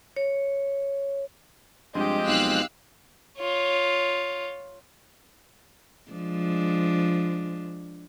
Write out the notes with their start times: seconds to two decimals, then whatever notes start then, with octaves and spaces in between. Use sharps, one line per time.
0.17 C#5
1.95 G2 F3 G#3 C4 G4 D#5
2.28 B1 F5 E6 F#6
3.39 F4 C#5
6.11 F3 G#3 D4